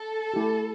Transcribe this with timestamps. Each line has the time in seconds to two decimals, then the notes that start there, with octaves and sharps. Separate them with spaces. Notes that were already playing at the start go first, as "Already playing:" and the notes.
Already playing: A4
0.34 A3 E4 G4